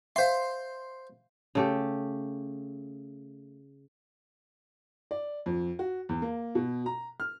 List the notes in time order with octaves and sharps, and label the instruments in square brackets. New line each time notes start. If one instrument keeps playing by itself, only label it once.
[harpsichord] C5 C6 [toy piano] E5 F5
[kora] C#3 A3 G4
[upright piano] D5
F2
F#4
E2
A#3
B2
A#5
F6